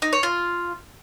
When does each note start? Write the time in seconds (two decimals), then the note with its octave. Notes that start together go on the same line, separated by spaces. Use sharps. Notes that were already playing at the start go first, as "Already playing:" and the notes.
0.02 D#4
0.13 C#5
0.23 F4